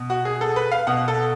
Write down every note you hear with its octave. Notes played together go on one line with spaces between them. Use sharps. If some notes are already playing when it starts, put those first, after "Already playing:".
Already playing: B2
F#4
G#4
A4
B4
F5
B2 F#5
A4